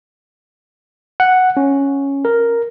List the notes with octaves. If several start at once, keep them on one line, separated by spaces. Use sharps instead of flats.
F#5
C#4
A#4